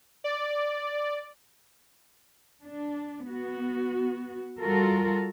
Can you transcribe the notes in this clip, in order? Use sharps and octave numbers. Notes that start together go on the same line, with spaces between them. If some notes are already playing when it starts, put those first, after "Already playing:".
D5
D4
B3 F#4
G3 F4 F#4 A4 A#4